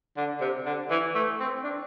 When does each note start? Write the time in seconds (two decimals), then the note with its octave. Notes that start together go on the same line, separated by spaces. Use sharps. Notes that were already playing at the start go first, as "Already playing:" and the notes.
0.17 D3
0.41 C3
0.66 D3
0.91 E3
1.15 A3
1.40 C4
1.64 D4